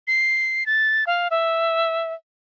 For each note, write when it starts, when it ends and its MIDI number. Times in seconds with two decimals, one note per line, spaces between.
0.07 0.66 96
0.66 1.04 93
1.07 1.28 77
1.31 2.13 76